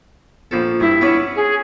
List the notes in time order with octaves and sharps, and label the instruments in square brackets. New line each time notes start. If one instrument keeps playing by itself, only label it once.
[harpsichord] A#1 F3 A4
[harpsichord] G2 [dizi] E4
[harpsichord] B3 C#4 D4
[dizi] G#4